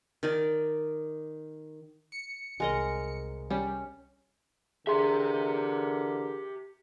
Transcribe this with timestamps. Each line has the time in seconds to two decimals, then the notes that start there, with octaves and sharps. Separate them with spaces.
0.23 D#3 D5
2.12 C#7
2.60 C2 G#3 A#4 D#5
3.50 G3 C#4
4.87 D3 E3 G4 G#4 A#4 E5 C6